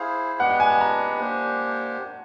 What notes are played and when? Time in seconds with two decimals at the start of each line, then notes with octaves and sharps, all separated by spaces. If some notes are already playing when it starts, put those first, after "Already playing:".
Already playing: E4 G#4 C5 F5
0.39 G#3 B3 D4 G4 B4 F#5
0.50 G5
0.60 G#5
0.70 A5
0.81 A#5
1.21 A#3 D4 G4 C5